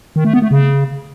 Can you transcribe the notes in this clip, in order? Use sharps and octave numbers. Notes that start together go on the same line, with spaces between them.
D#3
A3
B3
A3
C#3